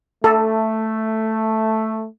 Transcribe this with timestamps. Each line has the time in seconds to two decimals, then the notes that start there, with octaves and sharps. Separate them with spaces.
0.24 A3 A4